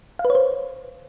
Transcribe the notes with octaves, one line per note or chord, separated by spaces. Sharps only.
F5
B4
C#5
C5